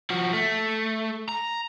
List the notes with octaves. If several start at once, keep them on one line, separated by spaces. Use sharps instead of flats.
F3 F#4
A3
A#5